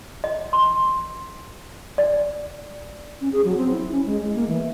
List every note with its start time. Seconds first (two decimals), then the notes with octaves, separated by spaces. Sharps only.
0.24 D#5
0.53 C6
1.98 D5
3.21 C#4
3.32 G#4
3.44 F#3
3.57 C4
3.71 E4
3.91 C#4
4.06 G#3
4.21 G#3
4.36 A#3
4.48 E3